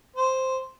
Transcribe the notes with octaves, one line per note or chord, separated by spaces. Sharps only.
C5